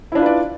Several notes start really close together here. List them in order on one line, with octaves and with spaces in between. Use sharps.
E4 D4 F4 B4 D5